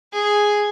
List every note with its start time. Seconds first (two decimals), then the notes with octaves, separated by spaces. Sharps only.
0.13 G#4